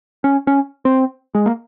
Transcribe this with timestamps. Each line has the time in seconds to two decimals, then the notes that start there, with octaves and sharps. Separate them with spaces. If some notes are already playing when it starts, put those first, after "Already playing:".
0.24 C#4
0.47 C#4
0.85 C4
1.35 G#3
1.46 A#3